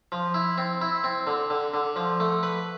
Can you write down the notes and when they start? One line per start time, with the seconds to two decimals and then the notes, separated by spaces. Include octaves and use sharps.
0.12 F3
0.34 E4
0.58 C4
0.81 E4
1.04 C4
1.27 D3
1.50 D3
1.74 D3
1.96 F3
2.20 A3
2.43 B4